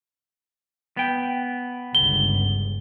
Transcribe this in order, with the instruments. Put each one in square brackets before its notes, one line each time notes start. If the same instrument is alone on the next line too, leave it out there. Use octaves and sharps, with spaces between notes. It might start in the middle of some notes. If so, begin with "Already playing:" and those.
[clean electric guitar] B3 G5
[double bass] G1 C#2 [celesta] G7